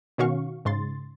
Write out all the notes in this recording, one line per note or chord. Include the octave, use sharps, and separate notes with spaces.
B2 D#3 C#4 F#4 F5 C#6
G#2 C#3 C6 A6